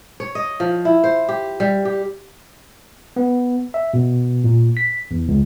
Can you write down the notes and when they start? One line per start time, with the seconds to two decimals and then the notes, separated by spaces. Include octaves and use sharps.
0.20 C#5
0.35 D#5
0.60 F3
0.85 E4
1.04 C5
1.29 G4
1.60 G3
1.85 G4
3.16 B3
3.74 E5
3.94 B2
4.44 A#2
4.77 B6
5.11 E2
5.28 C#2